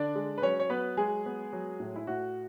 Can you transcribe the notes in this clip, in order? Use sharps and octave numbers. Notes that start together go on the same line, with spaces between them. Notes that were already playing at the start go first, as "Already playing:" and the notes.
Already playing: D3 D4 D5
G#3
B4
F#3 C#4 C#5
C#5
F#3 B3 B4
F#3 G#3 G#4
B3
F#3
A2
E4
A2 F#4